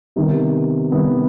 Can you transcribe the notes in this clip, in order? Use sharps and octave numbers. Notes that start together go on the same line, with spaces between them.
C3 D#3 G3 B3
C3 D#3 G3 B3